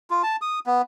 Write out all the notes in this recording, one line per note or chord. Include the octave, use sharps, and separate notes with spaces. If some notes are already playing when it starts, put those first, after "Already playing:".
F4
A5
D#6
B3